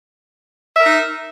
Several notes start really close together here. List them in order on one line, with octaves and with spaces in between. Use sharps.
E5 A#4 D#4